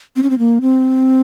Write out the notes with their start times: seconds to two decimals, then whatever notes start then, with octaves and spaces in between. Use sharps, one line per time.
0.16 C4
0.23 C#4
0.30 C4
0.39 A#3
0.61 C4